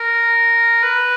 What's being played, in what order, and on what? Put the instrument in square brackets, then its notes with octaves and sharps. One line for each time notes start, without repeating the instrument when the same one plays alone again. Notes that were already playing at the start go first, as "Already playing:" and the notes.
Already playing: [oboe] A#4
B4